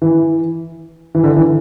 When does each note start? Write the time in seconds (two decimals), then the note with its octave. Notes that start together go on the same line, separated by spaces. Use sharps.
0.02 E3
1.15 E3
1.24 D3
1.37 E3